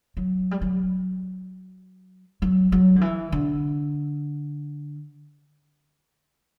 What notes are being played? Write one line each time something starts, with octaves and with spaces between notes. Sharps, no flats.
F#3
G3
F#3
F#3
F#3
D3
E3
D3